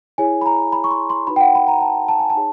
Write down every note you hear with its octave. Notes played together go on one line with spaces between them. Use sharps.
E4 G#4 C#5 G#5
B5
A#5
B5
C#6
C6
C6
D#4 F#4 B4 B5
G5
F#5
B5
A#5
A5
A5
G#5
A5
D#4 G#4 C#5